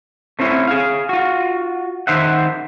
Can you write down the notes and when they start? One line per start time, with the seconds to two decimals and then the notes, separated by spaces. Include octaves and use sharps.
0.39 A3 C4 C#4 E4
0.67 G#4 F5
1.09 F4 F#4
2.07 D#3 C5 E5 F#5